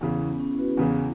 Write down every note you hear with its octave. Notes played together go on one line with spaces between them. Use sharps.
E2 C#3 E3 C#4
B3
C#4
E4
F#4 B4
E4 G#4
E2 C#3 E3